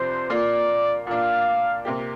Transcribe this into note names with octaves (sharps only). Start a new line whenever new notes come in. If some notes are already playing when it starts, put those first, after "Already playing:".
Already playing: F2 C3 D4 F4 C5
A#2 A#3 F4 D5
A#2 A#3 D4 F5
C3 A#3 G4